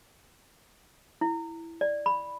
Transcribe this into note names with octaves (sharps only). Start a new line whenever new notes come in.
E4
D5
B5